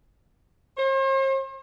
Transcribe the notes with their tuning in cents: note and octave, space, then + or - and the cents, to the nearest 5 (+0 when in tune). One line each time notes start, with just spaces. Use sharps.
C5 +45